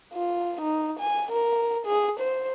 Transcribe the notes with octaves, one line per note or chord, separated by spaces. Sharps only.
F4
D#4
G#5
A#4
G#4
C5